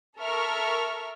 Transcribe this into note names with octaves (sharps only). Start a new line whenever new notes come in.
A4 A#4 E5 C#6 F6